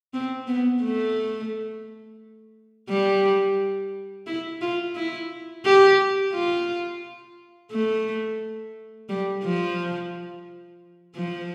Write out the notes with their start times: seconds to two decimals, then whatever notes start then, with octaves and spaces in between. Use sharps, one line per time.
0.14 C4
0.47 B3
0.82 A3
2.90 G3
4.27 E4
4.61 F4
4.96 E4
5.65 G4
6.33 F4
7.71 A3
9.09 G3
9.44 F3
11.16 F3